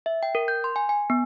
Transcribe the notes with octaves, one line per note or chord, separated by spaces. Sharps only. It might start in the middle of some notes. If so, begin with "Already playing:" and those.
E5
G5
A#4
G6
C6
G#5
G#5
B3